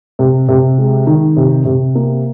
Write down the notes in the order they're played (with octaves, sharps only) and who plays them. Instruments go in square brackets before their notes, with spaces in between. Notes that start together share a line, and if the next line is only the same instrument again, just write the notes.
[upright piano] C3
C3
G#3
D#3
C3
C3
A#3